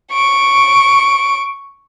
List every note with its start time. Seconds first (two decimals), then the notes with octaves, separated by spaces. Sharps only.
0.12 C#6 D7